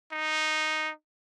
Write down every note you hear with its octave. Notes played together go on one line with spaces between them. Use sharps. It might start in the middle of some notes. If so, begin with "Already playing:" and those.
D#4